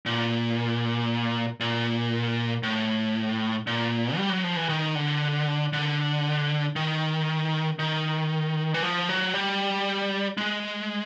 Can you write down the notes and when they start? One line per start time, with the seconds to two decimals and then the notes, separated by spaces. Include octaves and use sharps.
0.06 A#2
1.60 A#2
2.63 A2
3.67 A#2
4.17 G3
4.30 F#3
4.44 F3
4.56 E3
4.69 D#3
4.95 D3
5.73 D3
6.76 D#3
7.79 D#3
8.74 E3
8.83 F3
9.09 F#3
9.34 G3
10.37 G#3